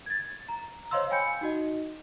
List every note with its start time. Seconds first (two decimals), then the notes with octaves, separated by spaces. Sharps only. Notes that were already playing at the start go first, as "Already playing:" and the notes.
0.06 G#6 A6
0.49 A#5
0.91 C5 C#5 D#5 F5 C6 E6
1.11 F5 G5 G#5 B5 G6 C#7
1.41 D#4 F#4 D#5